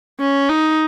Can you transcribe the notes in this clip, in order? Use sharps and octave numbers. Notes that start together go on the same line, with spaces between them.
C#4
D#4